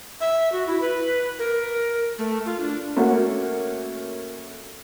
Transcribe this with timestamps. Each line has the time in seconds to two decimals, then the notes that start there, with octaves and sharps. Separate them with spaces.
0.21 E5
0.52 F#4
0.67 E4
0.81 B4
1.39 A#4
2.18 A3
2.46 F4
2.60 D4
2.96 A3 A#3 C#4 F#4